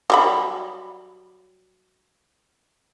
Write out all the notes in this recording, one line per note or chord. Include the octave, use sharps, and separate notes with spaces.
F#3 G3 B5